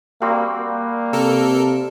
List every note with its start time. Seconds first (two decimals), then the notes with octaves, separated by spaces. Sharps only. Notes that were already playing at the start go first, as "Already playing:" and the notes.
0.22 G3 A#3 C4 F#4
0.58 A#3
1.13 C3 A4 A#4